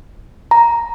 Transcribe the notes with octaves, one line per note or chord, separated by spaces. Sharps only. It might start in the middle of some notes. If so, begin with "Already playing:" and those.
A#5